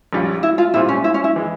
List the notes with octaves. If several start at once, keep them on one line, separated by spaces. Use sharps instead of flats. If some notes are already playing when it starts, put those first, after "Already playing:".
A#1 G#2 G3 C#4 F4
E4
F4
A#2 G3 C4 E4 F4
C#4
E4
C#4
E4
E3 G#3